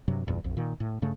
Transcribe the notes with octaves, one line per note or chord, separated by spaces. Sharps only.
G2 C3 F#3
A1 E2 G2 A#2
A#1 F2
A#2 D#3
A2
G2 C#3 A3